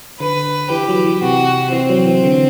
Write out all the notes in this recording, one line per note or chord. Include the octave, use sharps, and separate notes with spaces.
D3 B4
E3 G4
F#3
E3
C3 F#4
E3 C4
F#3
E3
D3